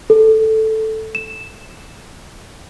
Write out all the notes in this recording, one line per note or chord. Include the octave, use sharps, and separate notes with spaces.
A4
E7